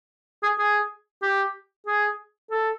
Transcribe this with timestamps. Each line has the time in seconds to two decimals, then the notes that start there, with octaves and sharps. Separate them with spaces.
0.43 G#4
0.59 G#4
1.22 G4
1.86 G#4
2.50 A4